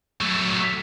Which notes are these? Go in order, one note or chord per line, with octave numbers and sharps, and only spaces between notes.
F#3 A3